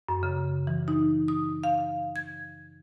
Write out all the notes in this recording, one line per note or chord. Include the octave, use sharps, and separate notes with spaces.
F#2
C#3
E3
D#4
D#6
F5
G#6